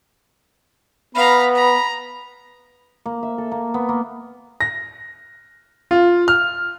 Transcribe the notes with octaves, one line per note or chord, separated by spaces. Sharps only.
B3 F5 A#5 B5
A#5 B5
A#3
E5
A4
A#3
B3
A#3
A#6
F4
F6